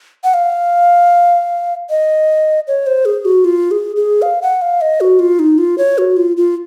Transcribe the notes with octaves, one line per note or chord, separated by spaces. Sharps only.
F#5
F5
D#5
C#5
C5
G#4
F#4
F4
G#4
G#4
F5
F#5
F5
D#5
F#4
F4
D#4
F4
C#5
F#4
F4
F4